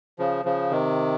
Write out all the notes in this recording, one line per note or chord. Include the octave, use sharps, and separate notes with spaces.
C#3 F3
C#3 F3
C3 D#3